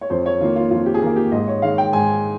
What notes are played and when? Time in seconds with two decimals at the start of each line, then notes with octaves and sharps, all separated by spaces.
0.01 C#5
0.10 F2 C5
0.26 C#5
0.40 D#3 A#3 F4
0.56 F4
0.71 F2 F4
0.86 G4
0.94 G#4
1.02 D#3 A#3 A#4
1.16 G4
1.32 G#2 D#5
1.48 C#5
1.62 D#3 G#3 F5
1.78 G5
1.92 G#2 G#5